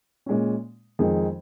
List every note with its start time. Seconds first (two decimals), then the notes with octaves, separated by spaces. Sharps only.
0.26 A#2 G#3 C#4
0.99 F2 D#3 G#3 D#4 G#4